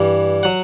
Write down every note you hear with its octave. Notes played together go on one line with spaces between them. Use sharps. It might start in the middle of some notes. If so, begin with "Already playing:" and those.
Already playing: G2 E3 G3
F#3 F#5